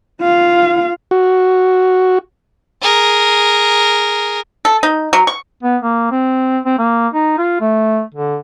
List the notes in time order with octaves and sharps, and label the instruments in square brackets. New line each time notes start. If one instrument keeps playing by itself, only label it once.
[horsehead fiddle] F4 F5
[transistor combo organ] F#4
[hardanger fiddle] G#4 A#4
[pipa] A4
D#4
F#3
C#6
[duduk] B3
A#3
C4
C4
A#3
D#4
F4
A3
D3